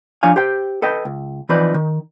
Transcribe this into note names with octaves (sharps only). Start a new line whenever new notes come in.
F3 D4 C#5 F5 G#5
G4 C5 G5
A4 B4 D#5 G5
C#2
E3 F3 C4 D#4 B4 D5
D#3